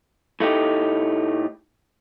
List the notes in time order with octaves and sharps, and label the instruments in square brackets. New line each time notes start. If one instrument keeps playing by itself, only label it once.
[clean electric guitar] A2 A3 D#4 G4